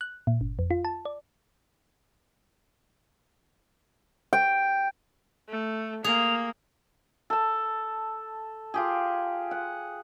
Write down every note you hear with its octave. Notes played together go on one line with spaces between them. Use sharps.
F#6
A#2
G1
F2
F4
A5
D5
G5
A3
A#3 G#4 F7
A4 A5
F4 G4 G#4
F#5